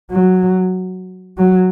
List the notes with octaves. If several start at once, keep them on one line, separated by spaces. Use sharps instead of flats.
F#3
F#3